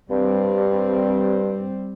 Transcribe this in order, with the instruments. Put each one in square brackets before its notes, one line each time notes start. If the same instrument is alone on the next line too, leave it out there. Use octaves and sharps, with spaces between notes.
[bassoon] G2 [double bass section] G3 C4